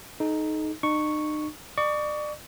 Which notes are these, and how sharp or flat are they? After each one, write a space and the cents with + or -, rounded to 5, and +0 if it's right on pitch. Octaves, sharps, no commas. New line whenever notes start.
D#4 +0 A4 -40
D#4 -40 C#6 +0
D5 +35 C#6 +25